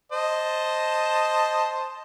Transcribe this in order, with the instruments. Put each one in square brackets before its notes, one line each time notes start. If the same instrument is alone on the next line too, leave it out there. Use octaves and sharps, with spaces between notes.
[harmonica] C5 D#5 A5